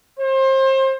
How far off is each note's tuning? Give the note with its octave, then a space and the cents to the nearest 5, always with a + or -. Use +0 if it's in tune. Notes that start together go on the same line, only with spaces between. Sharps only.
C5 +30